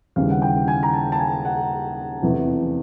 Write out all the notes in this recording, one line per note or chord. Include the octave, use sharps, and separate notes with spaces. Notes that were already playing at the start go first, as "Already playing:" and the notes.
D#2 C#3 E3 G3 F5
F#5
G5
G#5
A#5
A5
A5
G#5
F#5
F1 E2 C3 E3